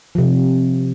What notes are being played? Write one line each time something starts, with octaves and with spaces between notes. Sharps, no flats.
C3 F3